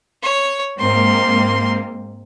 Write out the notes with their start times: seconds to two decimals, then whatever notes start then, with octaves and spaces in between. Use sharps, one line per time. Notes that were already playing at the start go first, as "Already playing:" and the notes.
0.23 C#5
0.79 G#2 A#3 C4 C6